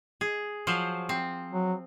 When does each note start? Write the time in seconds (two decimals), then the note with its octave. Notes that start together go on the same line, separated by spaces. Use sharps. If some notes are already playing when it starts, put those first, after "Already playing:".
0.21 G#4
0.67 F3 F#3 C5
1.09 C4
1.52 F#3